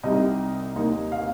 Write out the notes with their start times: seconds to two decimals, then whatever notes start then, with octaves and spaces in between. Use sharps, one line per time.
0.03 C2 C3 G3 D#4 D#5
0.76 D#2 D#3 A#3 D#4
1.12 F5